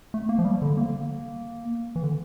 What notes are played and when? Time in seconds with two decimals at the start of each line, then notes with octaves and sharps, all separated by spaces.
0.14 A3
0.29 A#3
0.39 F3
0.45 G3
0.62 D3
0.77 A#3
1.96 E3
2.03 D3